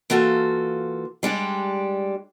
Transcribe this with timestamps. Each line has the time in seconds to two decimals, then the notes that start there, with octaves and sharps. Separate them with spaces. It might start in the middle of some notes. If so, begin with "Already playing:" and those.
0.10 E3 A#3 F4 F#4 A4
1.23 G3 G#3 D4 G4